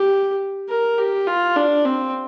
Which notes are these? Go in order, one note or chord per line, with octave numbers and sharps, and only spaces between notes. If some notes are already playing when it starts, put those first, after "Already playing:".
Already playing: G4
A#4
G4
F4
D4
C4